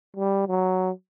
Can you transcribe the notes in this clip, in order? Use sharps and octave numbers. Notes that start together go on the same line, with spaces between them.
G3
F#3